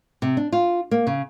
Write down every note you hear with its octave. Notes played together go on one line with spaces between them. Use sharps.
C3
D4
F4
A#3
C#3